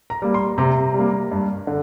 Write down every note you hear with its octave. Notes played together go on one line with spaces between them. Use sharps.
A#5
G3 A#3
C6
C3 A#5
G3 A#3
G2
D3